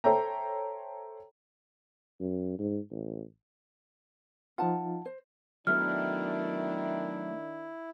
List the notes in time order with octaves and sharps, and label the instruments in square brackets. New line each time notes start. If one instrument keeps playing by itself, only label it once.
[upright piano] A4 C5 C#5 E5 G5 A#5
[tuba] F#2
G#2
A1
[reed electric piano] F3 D#4 F4 [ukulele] F#5 A5
[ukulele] C5
[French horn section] D#3 D4 [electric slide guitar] F#3 A3 B3 [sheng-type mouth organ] E4 [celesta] F6